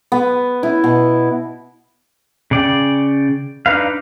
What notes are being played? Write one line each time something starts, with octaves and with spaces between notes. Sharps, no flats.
B3
E4
B2
C#3 D5 G5
D4 D#4 B4 F5